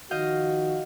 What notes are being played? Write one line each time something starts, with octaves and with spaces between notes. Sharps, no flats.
D#3 F3 F#4 D#5 F5 G6